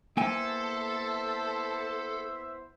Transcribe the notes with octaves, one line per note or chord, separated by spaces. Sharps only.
A#3 B3 E4 A4 C5 E5 G5 G#5